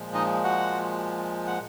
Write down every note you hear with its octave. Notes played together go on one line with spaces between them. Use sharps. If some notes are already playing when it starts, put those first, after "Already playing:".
Already playing: A#2 F3 G#3
D#4 D#5
F#4 F#5
F#5